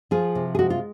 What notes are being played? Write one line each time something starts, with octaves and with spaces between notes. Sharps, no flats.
F3 F4 G#4
C3
G#4
G#3 F#4
F4